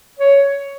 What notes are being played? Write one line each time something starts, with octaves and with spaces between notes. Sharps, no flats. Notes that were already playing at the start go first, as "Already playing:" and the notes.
C#5